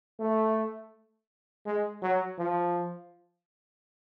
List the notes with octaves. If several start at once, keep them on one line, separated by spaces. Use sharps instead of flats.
A3
G#3
F#3
F3